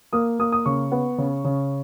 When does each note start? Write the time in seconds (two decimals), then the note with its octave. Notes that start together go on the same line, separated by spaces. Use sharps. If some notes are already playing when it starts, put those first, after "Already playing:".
0.13 A#3 D#6
0.39 A#3 D#6
0.52 D#6
0.66 C#3 C#6
0.92 B3
1.18 C#3
1.44 C#3